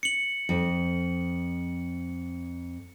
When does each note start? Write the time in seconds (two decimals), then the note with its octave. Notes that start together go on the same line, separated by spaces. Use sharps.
0.03 C#7 F#7
0.49 F2